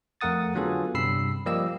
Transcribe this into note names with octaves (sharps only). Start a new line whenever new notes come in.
F2 A3 A#4 F#5 D#6 A6
D3 F#3 B3 F4 G#4 A4
G2 C3 B5 E6 C7
F3 G3 A#3 G4 D#5 E6